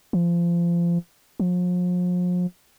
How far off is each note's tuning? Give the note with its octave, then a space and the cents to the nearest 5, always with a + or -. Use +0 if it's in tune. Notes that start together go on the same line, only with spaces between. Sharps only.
F3 -25
F3 +40